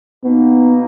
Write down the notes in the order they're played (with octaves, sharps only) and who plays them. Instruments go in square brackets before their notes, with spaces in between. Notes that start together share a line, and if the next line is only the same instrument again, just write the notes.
[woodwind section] B2 A#3 D#4 [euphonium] B3